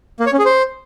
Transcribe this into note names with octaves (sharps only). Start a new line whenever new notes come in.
A#3
C#5
C#4
G#4
C5